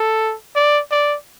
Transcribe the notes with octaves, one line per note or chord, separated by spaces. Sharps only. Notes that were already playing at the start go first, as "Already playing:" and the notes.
Already playing: A4
D5
D5